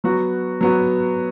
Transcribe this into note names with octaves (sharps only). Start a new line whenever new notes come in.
F#3 B3 F#4
F#3 B3 F#4